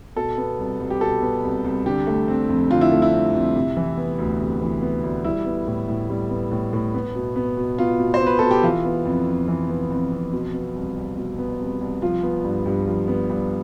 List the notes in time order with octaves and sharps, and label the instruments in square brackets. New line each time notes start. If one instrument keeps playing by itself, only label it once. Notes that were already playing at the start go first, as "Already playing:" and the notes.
[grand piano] B2 A4
B3
C2
C2
G4
B2 A4
B3
C2
C2
D3 G4
A3
C4
F2
D3 F4
E4
A3
E4
C4
F2
C3
E3
B3
D2
C3
E3
B3
D2
G3 E4
B3
A2
A2
G3
B3
A2
A2
B3
B2
B3
B2
B3 F4
B2
C5
B3
B4
B2 A4
G4
E3 F4
B3
F2
F2
E3
B3
F2
F2
B2
B3
C2
C2
B2
B3
C2
C2
F3 F4
B3
G2
G2
F3
B3
G2